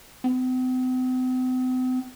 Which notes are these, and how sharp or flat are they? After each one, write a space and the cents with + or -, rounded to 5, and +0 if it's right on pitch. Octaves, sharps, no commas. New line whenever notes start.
C4 -45